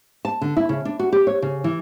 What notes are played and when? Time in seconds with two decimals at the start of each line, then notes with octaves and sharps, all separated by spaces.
0.25 A5
0.41 D3
0.57 E4
0.69 C#3
0.85 D4
0.99 F#4
1.12 G4
1.27 C#5
1.42 C#3
1.64 E3